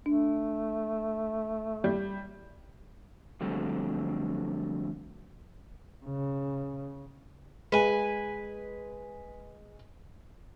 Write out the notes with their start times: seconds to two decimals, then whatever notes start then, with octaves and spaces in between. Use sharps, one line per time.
0.06 A3 D4
1.84 G3
3.41 F2 D3 F#3 G3 A3 C4
6.05 C#3
7.72 G#3 B4 G#5